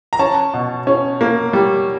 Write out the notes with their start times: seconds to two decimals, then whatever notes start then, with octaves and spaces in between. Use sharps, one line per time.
0.13 A#5
0.19 C#4 A5
0.54 B2
0.87 C#4
1.21 A#3
1.53 G3